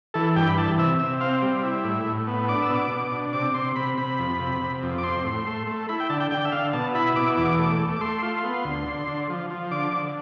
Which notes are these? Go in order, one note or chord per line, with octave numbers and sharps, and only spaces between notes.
E3 A4
G2 G5
B5
E3 A5
C3 E5
C3 E5
C4 F5
G3
E4
A2
A2
B3
D4 D6
E6
B2
D6
B2
D4
C3 D6
C3 C6
C3 B5
C3 B5
F2
C3
C3
F2
D6
C4 C6
A2
A3
A3
E4 B5
G5
D3 A5
G5
D3 G5
E5
D3 F5
B2 A5
E4 B5
B2 D6
E2 D6
A3
A3
D6
A3 C6
F4
B3
D2
D3
D3
F3
F3
D3 D6
D3